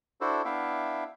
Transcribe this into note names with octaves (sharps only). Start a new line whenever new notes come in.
D4 E4 F#4 A4 C5
B3 D4 E4 E5 F5 G5